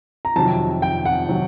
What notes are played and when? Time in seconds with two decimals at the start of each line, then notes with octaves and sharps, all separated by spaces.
0.25 A#5
0.36 F2 C3 D#3 F#3 A5
0.82 G5
1.05 F#5
1.29 C3 D#3 F#3